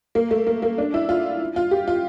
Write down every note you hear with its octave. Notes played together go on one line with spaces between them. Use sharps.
A#3
A3
A#3
A#3
D4
E4
F4
F4
G4
F4